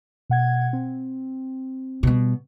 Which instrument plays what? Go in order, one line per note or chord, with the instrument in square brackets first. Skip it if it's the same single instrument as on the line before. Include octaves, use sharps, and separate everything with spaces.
[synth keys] B2 F#5 G#6
C4
[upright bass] B2 G3